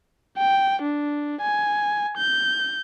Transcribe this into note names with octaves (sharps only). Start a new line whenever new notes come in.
G5
D4
G#5
G6